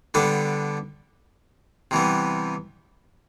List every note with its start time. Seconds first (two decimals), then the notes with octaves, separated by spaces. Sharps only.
0.14 D3 G3 B3 D4 A4
1.91 C3 E3 G3 B3